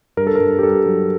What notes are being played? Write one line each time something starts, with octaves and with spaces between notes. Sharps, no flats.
G2 A#4
A4
A#4
G2
G4
G2 A4
F#3